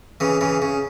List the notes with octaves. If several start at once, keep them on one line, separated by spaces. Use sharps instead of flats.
C#3 E3
C#3 E3
C#3